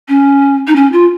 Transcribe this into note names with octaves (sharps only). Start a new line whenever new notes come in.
C#4
D#4
C#4
F4